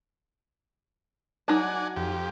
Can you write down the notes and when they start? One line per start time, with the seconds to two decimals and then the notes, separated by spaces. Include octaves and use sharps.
1.48 F#3 D#4 D5 F#5 G#5 A5
1.96 F2 G4